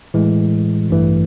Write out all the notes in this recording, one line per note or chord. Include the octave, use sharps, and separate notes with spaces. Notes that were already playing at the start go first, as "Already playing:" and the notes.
A2 E3 G#3
A1 G2 E3 A3